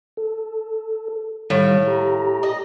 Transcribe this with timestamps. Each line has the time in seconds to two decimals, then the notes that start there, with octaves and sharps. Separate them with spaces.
0.17 A4
1.50 A2 D#3 G3 F5
1.87 G4 A#5
2.43 D#5